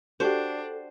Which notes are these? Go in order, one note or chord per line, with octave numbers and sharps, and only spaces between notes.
D4 F#4 G4 A4 C5